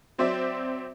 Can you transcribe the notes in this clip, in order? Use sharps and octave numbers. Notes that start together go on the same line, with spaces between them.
F#3 C4 C5 D5 E5